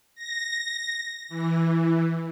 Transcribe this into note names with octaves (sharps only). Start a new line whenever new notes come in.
A#6
E3